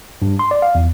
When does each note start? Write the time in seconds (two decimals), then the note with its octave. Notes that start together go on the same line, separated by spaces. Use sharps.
0.22 G2
0.39 C6
0.51 D5
0.62 F5
0.75 E2